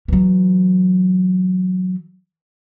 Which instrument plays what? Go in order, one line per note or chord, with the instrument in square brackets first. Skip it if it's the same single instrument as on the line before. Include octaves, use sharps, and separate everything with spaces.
[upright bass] E3 F#3